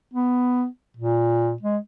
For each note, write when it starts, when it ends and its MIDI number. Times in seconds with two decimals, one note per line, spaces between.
0.14 0.66 59
0.97 1.53 46
1.62 1.78 56